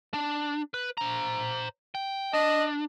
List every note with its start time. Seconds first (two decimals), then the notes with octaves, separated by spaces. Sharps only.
0.14 D4
0.74 B4
0.98 C5 A#5
1.95 G5
2.33 D4 D#5